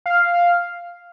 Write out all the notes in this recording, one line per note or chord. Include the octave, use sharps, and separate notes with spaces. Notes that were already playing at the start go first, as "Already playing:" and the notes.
F5